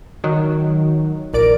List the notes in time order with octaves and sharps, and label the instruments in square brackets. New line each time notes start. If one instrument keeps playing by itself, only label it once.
[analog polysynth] D#3 F#3
[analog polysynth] A#1 D5 D7 [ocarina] A#4